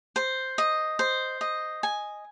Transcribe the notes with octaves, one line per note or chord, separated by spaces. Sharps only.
C5
D#5
C5
D#5
G#5